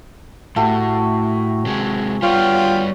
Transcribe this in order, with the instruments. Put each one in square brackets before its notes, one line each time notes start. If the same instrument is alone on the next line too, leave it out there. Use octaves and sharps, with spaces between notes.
[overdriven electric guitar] A2 [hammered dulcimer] A3 F#4 G4
[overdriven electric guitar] C3 G#3
[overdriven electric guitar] G3 B3 [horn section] F4 G5 [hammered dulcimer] C#5